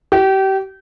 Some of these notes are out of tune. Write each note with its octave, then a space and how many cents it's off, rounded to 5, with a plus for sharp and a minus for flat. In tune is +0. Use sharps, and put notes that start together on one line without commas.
G4 -30